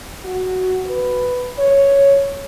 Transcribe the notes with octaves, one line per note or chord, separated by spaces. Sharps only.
F#4
B4
C#5